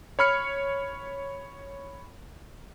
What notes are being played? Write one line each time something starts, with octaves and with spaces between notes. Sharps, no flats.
C#5 B5 F6 C#7